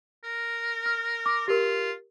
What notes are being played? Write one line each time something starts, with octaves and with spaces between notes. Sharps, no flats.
A#4
F6
D6
F4 G4 A#4